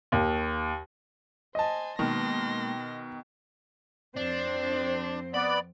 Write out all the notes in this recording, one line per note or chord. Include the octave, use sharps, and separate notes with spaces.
D#2
C5 D#5 G#5 A5
B2 D#3 G#3 A#3 C6 A#6
F2 C4 D4 C5
B3 D5 B5